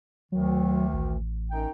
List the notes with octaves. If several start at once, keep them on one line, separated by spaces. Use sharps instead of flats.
D2 D#3 F#3
A1
F#2 D#4 G5